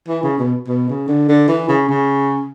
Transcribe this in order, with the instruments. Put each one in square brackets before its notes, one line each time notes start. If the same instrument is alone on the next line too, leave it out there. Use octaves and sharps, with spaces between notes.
[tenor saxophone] E3
C#3
B2
B2
C#3
D3
D3
E3
C#3
C#3